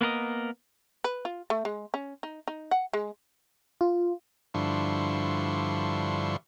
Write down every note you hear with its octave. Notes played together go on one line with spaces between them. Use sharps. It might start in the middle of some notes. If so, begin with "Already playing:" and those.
A#3 B3 A#4 D#5
B4
F4
A3
G#3
C#4
D#4
D#4
F#5
G#3
F4
G2 D3 F3 E4 C6 C#6